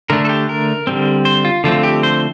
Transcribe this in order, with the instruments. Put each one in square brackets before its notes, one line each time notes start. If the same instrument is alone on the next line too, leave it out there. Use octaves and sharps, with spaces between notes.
[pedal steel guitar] D3 A3 D4 A#4
A4
G4
A#4
D3 G3 C4
C5
F4
D3 F3 A3 C4 F4
G4
C5